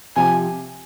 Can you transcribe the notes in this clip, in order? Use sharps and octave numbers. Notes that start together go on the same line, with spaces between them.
C3 F3 C4 G4 G#5